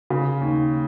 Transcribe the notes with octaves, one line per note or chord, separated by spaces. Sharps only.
C#3
D#2